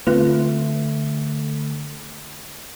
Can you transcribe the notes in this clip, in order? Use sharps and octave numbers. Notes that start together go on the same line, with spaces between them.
D3 A3 C4 F4 B4